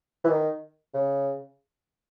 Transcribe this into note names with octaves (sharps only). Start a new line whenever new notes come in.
E3
D#3
C#3